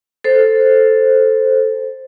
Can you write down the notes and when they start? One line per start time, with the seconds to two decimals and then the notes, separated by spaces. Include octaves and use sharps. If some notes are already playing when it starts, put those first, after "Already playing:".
0.24 A4 C5